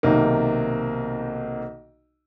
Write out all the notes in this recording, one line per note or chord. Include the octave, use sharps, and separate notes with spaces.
B1 C3 D#3 A#3